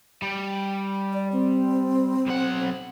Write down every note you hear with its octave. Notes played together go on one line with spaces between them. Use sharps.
G3
D5
C4
B1 F#5